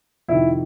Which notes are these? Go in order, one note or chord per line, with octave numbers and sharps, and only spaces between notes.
F2 C3 D#3 E4